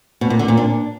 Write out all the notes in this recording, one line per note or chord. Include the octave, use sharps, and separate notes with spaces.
B2
A#2
D3
A#2
D4